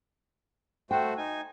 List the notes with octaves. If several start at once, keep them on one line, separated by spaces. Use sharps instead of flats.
A3 F#4 C5 G5
D#4 G#5